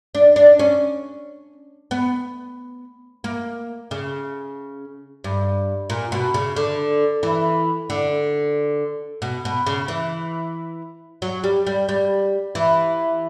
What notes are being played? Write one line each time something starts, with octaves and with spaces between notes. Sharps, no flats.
D4
D4
C#4
B3
A#3
C#3
G2
A#2
B2
C#3
D3
E3
D3
B2
B2
C#3
E3
F#3
G3
G3
G3
E3